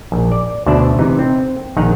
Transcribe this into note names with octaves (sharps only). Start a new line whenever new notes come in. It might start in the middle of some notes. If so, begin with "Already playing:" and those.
A#1
D5
D2 B2 D4 C5 D5 E5
C3 E3 D#4
C4
A#1 D#3 D#4 F#5 A#5